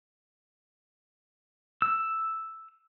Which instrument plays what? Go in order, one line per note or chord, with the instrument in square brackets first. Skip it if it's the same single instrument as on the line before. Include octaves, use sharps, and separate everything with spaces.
[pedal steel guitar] E6